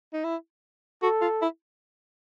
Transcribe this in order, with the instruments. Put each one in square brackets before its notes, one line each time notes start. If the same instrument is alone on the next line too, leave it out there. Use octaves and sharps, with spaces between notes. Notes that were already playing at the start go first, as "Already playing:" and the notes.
[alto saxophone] D#4
E4
[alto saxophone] F#4 [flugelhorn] A4
[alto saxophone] F4
E4